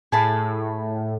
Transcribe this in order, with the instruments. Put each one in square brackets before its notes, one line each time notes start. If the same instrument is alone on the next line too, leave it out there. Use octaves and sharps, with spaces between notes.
[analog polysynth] A2 [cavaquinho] G#4 A5 B5